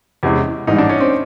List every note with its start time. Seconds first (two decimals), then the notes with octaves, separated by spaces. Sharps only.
0.23 E2 C3 E3 G#3 C#4
0.67 A1 G#2 E3 G3 D#4
0.78 D4
0.89 C#4
1.00 C4